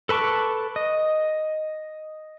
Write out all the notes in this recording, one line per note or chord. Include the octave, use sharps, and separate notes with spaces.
A4 B4 A5 C#6 D6
D#5